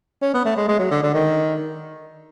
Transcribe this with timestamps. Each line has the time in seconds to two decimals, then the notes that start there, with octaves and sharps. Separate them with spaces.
0.22 C#4
0.34 B3
0.45 A3
0.57 G#3
0.69 G#3
0.79 F#3
0.91 D3
1.03 D3
1.14 D#3